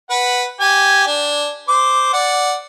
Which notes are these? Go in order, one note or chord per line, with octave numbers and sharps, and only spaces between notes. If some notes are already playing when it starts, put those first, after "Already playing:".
B4 F#5
G4 G#5
D4
C5 D6
D5 F#5